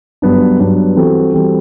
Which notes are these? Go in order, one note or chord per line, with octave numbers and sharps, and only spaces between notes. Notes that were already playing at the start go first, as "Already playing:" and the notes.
G2 F#3 B3 D4
G2 F#3 B3 D4
E3 G3 C4 F#4 A4
E3 G3 C4 F#4 A4